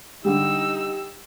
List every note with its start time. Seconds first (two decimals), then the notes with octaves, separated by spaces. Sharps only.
0.25 D3 G3 D#4 G4 E6